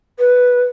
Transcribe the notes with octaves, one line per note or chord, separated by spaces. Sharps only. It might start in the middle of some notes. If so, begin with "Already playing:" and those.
B4